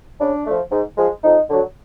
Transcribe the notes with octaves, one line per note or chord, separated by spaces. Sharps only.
C#3 D4
F3 A3
G#2
F3 G#3
F2 D#4
D3 F#3